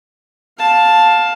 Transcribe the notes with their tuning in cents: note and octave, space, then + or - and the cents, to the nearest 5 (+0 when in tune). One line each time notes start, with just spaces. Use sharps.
F5 +15 A5 +0